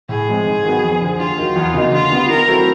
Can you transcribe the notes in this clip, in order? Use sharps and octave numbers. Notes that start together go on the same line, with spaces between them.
A2 G#4
F3 G#3 C4
G#2
D#3 F#3 B3
F2
D3 F3
D#2 F4
D#3 F#3
E2
C#3 F#3 A#3 D#4
D3 F4
G3 B3
D#3 A#4
F#3 A3 C4 E4